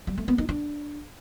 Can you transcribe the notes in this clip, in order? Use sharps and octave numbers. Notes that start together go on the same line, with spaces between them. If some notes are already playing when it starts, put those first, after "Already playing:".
G3
A3
B3
D#4
D4